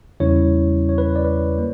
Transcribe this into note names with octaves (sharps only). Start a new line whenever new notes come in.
E2 C#3 G3 C#4 E4 C#5
C#5
B4
D5
B4
A#3